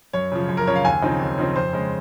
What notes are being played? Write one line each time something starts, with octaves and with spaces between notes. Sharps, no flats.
F#2 C#5
C#3 F3
F#2
A#4
C#3 F3 C#5
F5
D#2 G#5
C#3 F3 C4 D#4
D#2
C#3 F3 C4 D#4
F2 C5
C#3 G#3